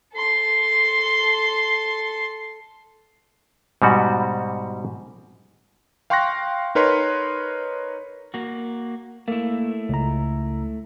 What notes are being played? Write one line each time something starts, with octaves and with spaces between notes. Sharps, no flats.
A4 C6
G#2 B2 G3 F#4
F5 G5 C6 C#6 F#6 A#6
D#4 A#4 B4 C#5 C6
A#3 F#4
A3 A#3 E4
C#2 A#5